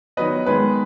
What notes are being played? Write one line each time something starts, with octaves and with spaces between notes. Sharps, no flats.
D#3 F#3 B3 B4 D#5
D#3 G#3 B3 B4